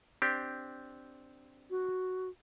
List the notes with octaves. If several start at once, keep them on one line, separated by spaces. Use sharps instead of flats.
C4 D4 G4
F#4